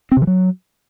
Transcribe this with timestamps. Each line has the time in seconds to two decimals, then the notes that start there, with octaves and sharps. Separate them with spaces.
0.12 C4
0.17 C3
0.22 E3
0.27 F#3